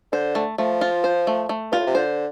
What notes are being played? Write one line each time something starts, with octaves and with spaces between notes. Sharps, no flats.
D3 C5
A3
F3 A3
F4
C5
A3
A3
G2 F4
A2
C3
D3 C5